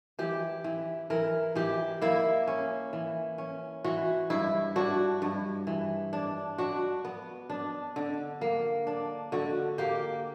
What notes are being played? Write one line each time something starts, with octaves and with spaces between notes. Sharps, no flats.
E3 G4
E3
E3 A#4
E3 G4
A#3 E4
C#4
E3
C#4
E3 F#4
G2 E4
D4 F#4
G2
E3
D4
D4 F#4
B3
D4
D3
A#3
D4
D3 F#4
A#3 G4